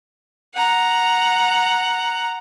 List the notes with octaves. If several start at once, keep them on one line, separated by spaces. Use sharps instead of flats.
F#5 A#5